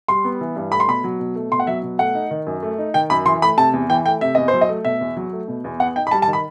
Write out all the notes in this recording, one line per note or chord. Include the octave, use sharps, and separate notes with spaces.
G3 C6
B3
E3
G2
A3 B5
C6
B2 B5
F#3
B2
A3
B2 C6
F#5
F#3 E5
B2
A3 F#5
D#4
D#3
F#2
A3
D#4
D#3 G5
F#2 B5
E3 C6
A3 B5
C3 A5
E2
E3 G5
A3 G5
C3 E5
E2 D#5
C5
F#3
D#5
A3
B2 E5
E2
F#3
A3
B2
E2
B3 F#5
D#4 G5
B5
G3 A5
A5
D#3
B5